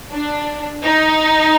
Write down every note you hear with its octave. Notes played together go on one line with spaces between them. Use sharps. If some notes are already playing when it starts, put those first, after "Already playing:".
D4
D#4